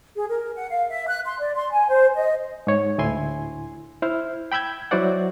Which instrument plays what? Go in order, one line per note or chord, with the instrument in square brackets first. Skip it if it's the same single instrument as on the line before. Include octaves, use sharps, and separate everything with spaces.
[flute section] G#4
A#4
F#5
F5
E5
F#6
C6
D5
C6
G#5
C5
D#5
[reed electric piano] G#2 C#5
D2 A2 E4 G#5 C6
E4 C5 F6
G5 B5 E6 G6 G#6
F#3 E4 F#4 C5 D5 F#5